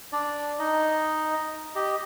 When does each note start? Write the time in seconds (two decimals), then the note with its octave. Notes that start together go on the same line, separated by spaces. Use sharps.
0.12 D4 D5
0.59 D#4 D#5
1.76 G4 D#5